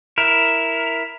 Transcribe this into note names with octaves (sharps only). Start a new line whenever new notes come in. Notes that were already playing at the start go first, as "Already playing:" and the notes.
E4 A#4